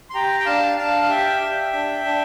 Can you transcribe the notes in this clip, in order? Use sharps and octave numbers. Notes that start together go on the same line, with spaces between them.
C6
G4 G5 A#5
G5
D4 F5 A5
D4 F5 A5
F5
G4 E5 G5
G4
D4
D4